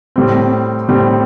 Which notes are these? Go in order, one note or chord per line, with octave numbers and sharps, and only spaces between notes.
A2 G3 C4
A2 G3 C4